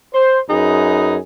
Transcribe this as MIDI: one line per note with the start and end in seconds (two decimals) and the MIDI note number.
0.14 0.39 72
0.49 1.17 42
0.49 1.17 63
0.49 1.17 68
0.49 1.17 71